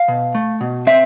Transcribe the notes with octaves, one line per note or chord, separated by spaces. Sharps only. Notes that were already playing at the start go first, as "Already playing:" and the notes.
Already playing: F5
B2
A3
B2
C4 E5